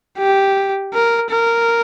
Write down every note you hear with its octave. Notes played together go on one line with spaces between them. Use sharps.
G4
A#4
A#4